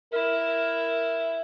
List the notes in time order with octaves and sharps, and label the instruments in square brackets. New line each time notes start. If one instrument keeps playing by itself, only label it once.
[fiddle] E4 [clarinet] A#4